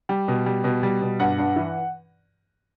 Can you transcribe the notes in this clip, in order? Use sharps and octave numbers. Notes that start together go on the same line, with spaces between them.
G3
B2
G3
B2
G3
B2
G2 F#5
G2
E3